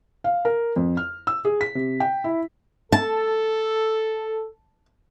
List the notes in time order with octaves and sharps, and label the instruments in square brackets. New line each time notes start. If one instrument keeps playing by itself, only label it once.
[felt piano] F5
A#4
F2
F6
E6
G#4
B6
C3
G5
E4
[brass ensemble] A4 [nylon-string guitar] A5